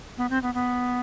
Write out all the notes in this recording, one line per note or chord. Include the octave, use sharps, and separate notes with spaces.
B3
C4
B3
B3